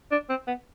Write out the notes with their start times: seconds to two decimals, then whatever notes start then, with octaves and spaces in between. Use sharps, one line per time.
0.11 D4
0.29 C4
0.47 B3